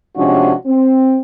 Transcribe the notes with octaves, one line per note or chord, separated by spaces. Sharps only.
C3 F3 G#3 C#4 D4 F#4
C4